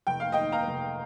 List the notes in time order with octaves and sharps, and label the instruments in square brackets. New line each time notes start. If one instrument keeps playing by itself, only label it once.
[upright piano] F1 G5
F5
D#3 D#5 G5
F5 A#5
F1